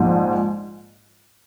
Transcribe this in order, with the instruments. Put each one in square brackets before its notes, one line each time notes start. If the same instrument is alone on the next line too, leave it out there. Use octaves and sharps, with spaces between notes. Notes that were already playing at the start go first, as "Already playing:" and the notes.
Already playing: [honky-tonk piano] A#1 G#2 F3